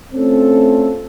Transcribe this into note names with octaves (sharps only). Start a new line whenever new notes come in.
A3 C4 C#4 F4 A4